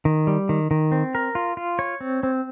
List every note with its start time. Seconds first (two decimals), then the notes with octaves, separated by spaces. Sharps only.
0.05 D#3
0.27 G3
0.49 D#3
0.71 D#3
0.92 C4
1.15 A#4
1.35 F4
1.57 F4
1.79 C#5
2.01 C4
2.23 C4